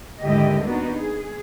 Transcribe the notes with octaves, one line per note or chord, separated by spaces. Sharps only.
D#2 G#2 D3 E4 G4 D#5
A#3 B3 D4 D#4 F#4
G#4